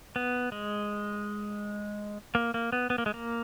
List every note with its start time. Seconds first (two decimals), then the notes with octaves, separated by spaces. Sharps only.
0.16 B3
0.52 G#3
2.35 A#3
2.54 A#3
2.72 B3
2.90 B3
2.98 A#3
3.06 G#3
3.14 A#3